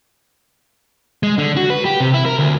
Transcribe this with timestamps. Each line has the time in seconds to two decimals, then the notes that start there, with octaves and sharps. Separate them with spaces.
1.23 G#3
1.38 D3
1.57 F#4
1.70 B4
1.85 G4
2.00 C3
2.14 E4
2.26 A#4
2.39 D2